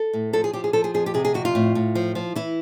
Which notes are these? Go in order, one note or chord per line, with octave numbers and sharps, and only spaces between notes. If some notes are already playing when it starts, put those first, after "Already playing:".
Already playing: A4
A2
F3 A4
G#4
F3 G4
G#4
F3 A4
G#4
F2 G#4
G4
C3 G#4
G#4
F2 F#4
F4
A2
A2
F3
F3
E3 E4